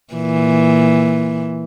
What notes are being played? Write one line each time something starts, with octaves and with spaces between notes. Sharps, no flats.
A#2 E3